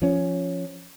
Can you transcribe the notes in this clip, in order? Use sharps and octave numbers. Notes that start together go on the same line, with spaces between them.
F3 C#4